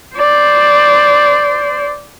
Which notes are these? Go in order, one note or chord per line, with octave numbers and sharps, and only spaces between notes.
C5 D5